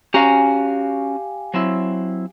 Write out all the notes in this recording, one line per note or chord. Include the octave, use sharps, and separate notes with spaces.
C#4 F#4 G4 F5 G#5 A#5
F#3 C4 E4